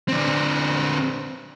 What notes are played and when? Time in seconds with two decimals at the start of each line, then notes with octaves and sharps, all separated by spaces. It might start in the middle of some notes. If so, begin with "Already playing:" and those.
0.08 D3 C4